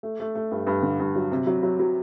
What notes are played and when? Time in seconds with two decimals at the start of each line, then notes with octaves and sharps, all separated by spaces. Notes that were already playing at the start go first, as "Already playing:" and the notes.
0.03 A3
0.20 A3
0.35 A3
0.51 G2
0.67 G2
0.83 D3
1.00 G2
1.15 F#3
1.32 C3
1.47 F#3
1.63 F#3
1.79 F#3